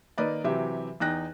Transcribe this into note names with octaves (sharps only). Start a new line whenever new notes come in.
D#3 A#3 B4 D5 D#5
C3 E3 F#3 G4 E5
E2 D#4 G5 F#6 A#6